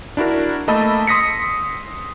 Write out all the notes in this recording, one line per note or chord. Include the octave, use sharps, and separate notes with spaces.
D4 E4 F#4 A#4
A3 A#3 D#5 A5 B5 E6
C6 D#6 A#6 B6 C#7